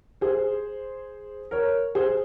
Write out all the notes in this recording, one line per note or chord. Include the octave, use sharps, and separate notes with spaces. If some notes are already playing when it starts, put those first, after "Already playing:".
G#4 C5
A#4 C#5
G#4 C5